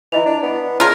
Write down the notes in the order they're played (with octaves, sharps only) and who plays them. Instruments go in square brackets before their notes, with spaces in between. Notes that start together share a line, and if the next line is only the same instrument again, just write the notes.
[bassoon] E3 [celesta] E4 D#5 F7
[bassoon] D4
B3
[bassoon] C#3 [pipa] F4 A#4